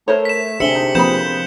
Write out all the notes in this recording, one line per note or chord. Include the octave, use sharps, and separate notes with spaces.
A3 A#4 C5 C#5
B6 E7
C3 D4 G#4 E5 G#5 C#7 F#7 G7
D#4
F3 A#3 C4 G#4 B4 B5 G6 E7